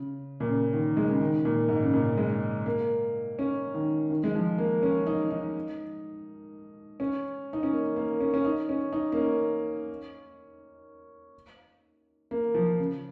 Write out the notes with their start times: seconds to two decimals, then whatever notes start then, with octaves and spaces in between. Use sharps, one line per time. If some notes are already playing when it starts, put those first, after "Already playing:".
Already playing: C#3
0.40 A#2
0.49 C#3
0.73 D#3
0.97 G#3
1.09 C#3
1.21 D#3
1.45 A#2
1.69 G#2
1.83 C#3
1.93 A#2
2.17 G#3
2.66 A#3
3.39 C#4
3.74 D#3
4.10 D#3
4.24 G#3
4.35 F3
4.58 A#3
4.83 C#4
5.07 D#4
5.31 D#4
7.00 C#4
7.53 D#4
7.63 C#4
7.72 A#3
7.96 A#3
8.21 C#4
8.34 C#4
8.45 D#4
8.69 C#4
8.93 D#4
9.12 A#3
9.17 C#4
12.31 A#3
12.54 F3
12.79 C#3